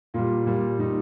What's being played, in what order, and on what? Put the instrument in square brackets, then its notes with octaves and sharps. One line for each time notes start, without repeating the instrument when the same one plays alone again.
[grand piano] A#2 G3 F4
A#2 G3
A#2 G3 D#4